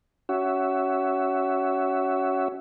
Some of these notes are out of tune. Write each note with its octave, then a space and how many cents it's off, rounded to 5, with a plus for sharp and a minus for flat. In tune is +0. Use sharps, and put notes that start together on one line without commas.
C#4 +15 F#4 +15 E5 +0